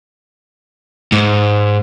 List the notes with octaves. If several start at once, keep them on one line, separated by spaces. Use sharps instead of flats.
G#2